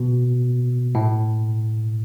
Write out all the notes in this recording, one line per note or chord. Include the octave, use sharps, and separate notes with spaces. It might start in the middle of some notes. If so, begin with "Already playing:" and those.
Already playing: B2
A2